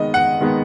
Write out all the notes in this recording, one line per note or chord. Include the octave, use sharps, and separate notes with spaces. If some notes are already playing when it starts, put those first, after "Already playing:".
Already playing: D#3 G#3 B3 D#5
F#5
D#3 G#3 B3